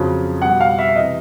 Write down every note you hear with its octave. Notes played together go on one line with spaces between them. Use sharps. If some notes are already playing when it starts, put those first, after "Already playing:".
Already playing: F2 C#3 F#3
B2 G3 F#5
F5
E5
E5
C3 E3 D#5